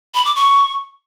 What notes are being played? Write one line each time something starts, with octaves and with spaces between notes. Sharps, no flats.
B5
D6
C#6